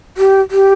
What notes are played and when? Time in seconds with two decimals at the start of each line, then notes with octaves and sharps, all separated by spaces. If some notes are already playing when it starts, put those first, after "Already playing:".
0.17 G4
0.51 G4